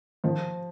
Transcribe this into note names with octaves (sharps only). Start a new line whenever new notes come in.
D#3 F3